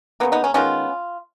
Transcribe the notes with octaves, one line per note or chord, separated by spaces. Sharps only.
C#3 F3 A#3 B3
B3 D#4
C#4
D#3 G#3 B3 C#4 F4